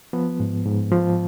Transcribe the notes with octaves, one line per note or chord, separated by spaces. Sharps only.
F3 B3
G#2
G#2
F3